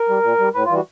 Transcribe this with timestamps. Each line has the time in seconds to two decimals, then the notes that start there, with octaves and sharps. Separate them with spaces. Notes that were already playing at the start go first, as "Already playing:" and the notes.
Already playing: A#4
0.09 G3
0.23 A#2
0.39 G3
0.54 A2 B4
0.65 F4
0.70 E3 G3 F#4